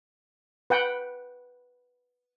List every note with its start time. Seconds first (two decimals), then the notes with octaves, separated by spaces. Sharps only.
0.70 B4 F#5 G5